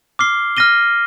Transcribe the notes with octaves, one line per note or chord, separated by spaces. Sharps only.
D6 F6 C7 G7
F6 A#6 D#7 G7